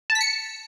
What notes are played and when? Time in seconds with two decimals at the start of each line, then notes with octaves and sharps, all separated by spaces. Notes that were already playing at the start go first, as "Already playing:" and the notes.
0.10 A5
0.15 B6
0.21 C#7